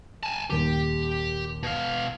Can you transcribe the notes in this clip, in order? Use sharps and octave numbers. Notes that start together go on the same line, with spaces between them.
G#5 A5
D#1 D#2 G4
B2 F5